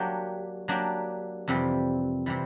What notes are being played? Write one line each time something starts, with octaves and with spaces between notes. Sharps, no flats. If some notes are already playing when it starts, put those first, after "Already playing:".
Already playing: F#3 A#3 D4 G4
F#3 A#3 D4 G4
F2 C3 E3 G3
C3 E3 G3